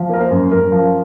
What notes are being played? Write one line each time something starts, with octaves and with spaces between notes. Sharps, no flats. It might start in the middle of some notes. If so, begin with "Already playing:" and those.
Already playing: F3
A#3 A#4
C5
F#2
F#2 A#4
F3